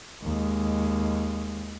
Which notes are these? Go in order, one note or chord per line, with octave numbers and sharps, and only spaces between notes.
D#2 G#3